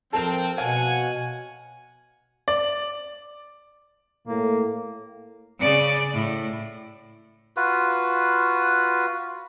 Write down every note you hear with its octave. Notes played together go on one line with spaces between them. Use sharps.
F3 C4 A4 A#4 F7
B2 C#5 F5 F#5 G#5
D5
A2 A#3
C#3 D5
A2
F4 F#4 B4